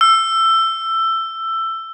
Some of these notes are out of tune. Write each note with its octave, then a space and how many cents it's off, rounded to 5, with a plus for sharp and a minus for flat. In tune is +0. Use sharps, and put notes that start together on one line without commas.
E6 +15